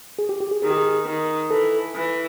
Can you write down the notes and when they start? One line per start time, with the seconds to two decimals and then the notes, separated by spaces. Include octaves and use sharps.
0.19 G#4
0.29 G4
0.40 G4
0.51 G#4
0.62 D#3 G#4
0.70 G4
0.77 G#4
1.06 D#3
1.50 E3 A4
1.95 E3